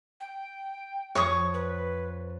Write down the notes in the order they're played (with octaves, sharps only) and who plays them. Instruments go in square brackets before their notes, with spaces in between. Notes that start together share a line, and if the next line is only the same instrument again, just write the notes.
[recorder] G5
[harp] F2 [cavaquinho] C#5 C#6 D#6
[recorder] B4